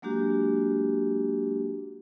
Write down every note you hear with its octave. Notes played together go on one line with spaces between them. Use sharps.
F#3 G#3 A#3 D4 F#4 G4